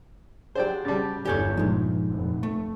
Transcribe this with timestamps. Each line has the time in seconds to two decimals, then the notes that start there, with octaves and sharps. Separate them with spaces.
0.55 F#3 G4 G#4 C5 D5 G5
0.85 C#3 G3 A5 D6 A6
1.25 G1 E2 G4 A4 C#5 D5 G#5 G6
1.57 D#2 A#2 F3 G#3 D#4
2.11 F1
2.43 A3